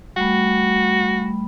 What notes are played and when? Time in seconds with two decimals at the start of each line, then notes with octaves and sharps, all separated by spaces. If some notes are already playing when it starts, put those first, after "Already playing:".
0.16 G3 A3 F#4 B5